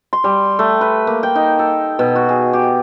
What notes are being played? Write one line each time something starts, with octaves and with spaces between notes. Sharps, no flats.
C6
G3
A3
B4
A#3
G5
D#4
A4
B2
F#4
G#4
G4